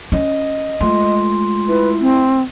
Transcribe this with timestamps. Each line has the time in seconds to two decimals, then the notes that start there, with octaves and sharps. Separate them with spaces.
0.12 C#4 D#5
0.80 G#3 A3 F4 C6
1.68 E4 B4
2.01 C4